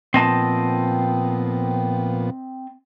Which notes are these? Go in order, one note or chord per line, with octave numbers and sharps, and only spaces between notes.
A#2 F3 B3 C4 D#5 A5